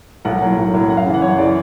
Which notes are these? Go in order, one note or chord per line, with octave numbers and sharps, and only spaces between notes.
B1 F#5
A2 F#3 A#3
B1
A2 F#3 A#3
F#2 F#5
F5
C#3 E3
F#5
F#2 C#5
C#3 E3 D5